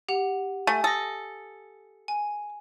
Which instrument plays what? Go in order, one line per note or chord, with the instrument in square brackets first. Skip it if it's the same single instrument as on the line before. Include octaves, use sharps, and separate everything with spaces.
[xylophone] G4 F#5 F7
[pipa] A3 [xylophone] G#5
[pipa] A4 [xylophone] D#6 A#6
[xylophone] G#5